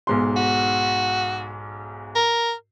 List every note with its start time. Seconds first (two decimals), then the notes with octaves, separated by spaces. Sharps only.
0.07 B1 G#2 C6
0.37 F#4
2.15 A#4